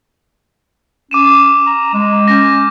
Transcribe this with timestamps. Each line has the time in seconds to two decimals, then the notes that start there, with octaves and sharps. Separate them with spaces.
1.11 C#4 D6 D#7 E7
1.67 A#5
1.94 G#3
2.28 C#4 G6 A#6